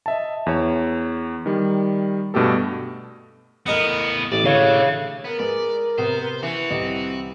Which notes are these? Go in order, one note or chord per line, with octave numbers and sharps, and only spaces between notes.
D#5 E5 A5
E2 C#5
D#3 G3
G2 B2 A3 G4 A4
A2 B3 A#4 D#5 F#5
A1 D5
D3 G#4 C#5 F5
B3 A#4
G#3 B4 D5
C3 B3 C5
E3 F#4
C2 G3 C4 D#5